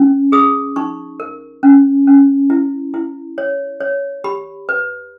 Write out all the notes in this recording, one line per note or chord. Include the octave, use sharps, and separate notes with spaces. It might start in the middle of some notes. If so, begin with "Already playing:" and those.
Already playing: C#4
G#4 D#6
D#4 C#6
A#4
C#4
C#4
E4
E4
C#5
C#5
G4 B5
B4